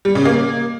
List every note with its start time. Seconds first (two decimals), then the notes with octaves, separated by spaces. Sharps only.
0.05 G3
0.15 C#3
0.25 A#3